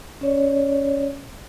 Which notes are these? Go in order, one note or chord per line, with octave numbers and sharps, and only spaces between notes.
C#4 C#5 D5